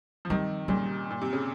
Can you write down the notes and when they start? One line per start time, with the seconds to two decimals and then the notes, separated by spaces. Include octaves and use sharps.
0.25 F3
0.30 C3 D#3 G3
0.68 A#2 C#3 G3
1.10 A#2
1.21 C3
1.33 C#3